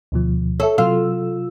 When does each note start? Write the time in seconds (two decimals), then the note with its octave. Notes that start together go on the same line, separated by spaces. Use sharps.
0.12 D2 B2 F3
0.60 A4 C#5 E5
0.78 C3 F#3 F4 E6